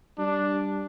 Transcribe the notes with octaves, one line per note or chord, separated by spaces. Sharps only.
G3 D4